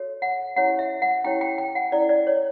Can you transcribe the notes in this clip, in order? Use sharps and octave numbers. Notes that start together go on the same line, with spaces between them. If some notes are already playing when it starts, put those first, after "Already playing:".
Already playing: F#4 A4 C#5
F#5
C#4 E4 G4 C#5 F#5
E5
F#5
C#4 E4 G4 C#5 G5
G5
G5
F#5
C#4 E4 A4 D5
D5
C#5